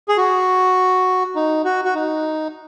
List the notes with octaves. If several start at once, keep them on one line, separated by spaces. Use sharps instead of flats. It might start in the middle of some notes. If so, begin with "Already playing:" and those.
G#4
F#4
D#4
F#4
F#4
D#4